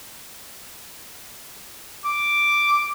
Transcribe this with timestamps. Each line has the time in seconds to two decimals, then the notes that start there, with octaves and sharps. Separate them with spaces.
2.05 D6